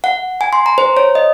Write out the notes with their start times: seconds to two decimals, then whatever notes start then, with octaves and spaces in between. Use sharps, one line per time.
0.04 F#5
0.41 G#5
0.53 C6
0.66 A#5
0.78 C5
0.97 C#5
1.15 D#5